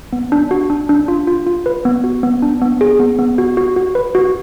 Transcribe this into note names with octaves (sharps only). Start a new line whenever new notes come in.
B3
D4
F#4
D4
D4
F4
F4
F4
B4
B3
F#4
B3
D4
B3
G#4
B3
B3
F#4
F#4
F#4
B4
F#4